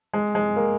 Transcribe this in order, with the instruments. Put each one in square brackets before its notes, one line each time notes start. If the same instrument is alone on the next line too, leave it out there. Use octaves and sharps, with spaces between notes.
[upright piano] G#3
G#3
A#3